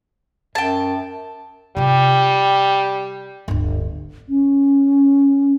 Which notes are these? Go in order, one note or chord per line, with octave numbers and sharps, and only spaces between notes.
F#2 G5 A5
C3 G3 F4
D1 G1
C#4